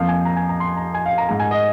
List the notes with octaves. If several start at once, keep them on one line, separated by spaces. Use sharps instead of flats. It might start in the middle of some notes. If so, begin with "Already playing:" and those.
Already playing: F2 F3 A#3 F5
G#5
A#5
G#5
A#5
C6
A#5
G#5
F5
A#5
G#2 G#3 A#5
G#5
D#5